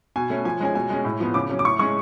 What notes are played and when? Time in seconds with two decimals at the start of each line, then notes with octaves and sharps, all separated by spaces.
0.16 B2 G#5
0.30 A3 C#4
0.45 F3 G#5
0.60 G#3 C#4 G#5
0.75 B2 G#5
0.90 G#3 C#4
1.04 A2
1.20 F3 B3
1.34 C#3 D6
1.50 F#3 C#4
1.59 D6
1.65 A2 C#6
1.79 G#3 C#4 C#6